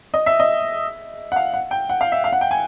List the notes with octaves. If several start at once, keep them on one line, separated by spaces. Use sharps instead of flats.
D#5
E5
D#5
F#5
F5
F#5
G5
F#5
F5
E5
F5
F#5
G5
G#5